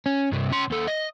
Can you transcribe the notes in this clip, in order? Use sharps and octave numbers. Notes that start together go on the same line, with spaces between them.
C#4
G2 C3
C#3 C6
D#2 A4
D#5